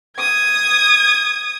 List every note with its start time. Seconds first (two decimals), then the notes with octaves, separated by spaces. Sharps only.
0.19 D#6 G#6